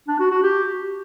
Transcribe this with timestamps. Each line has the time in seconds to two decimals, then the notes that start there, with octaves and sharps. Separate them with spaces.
0.08 D4
0.20 F#4
0.31 F#4
0.43 G4